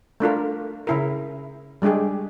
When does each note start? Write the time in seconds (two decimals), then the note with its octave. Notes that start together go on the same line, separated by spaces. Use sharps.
0.20 A3 D4 F4 A#4
0.87 C#3 E4 A#4
1.82 G3 G#3 D4 G4 G#4